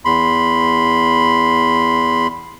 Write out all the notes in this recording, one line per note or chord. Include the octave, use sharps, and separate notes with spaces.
E2 B5 C6